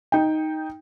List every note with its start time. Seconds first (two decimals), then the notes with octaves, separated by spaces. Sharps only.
0.12 D#4 G5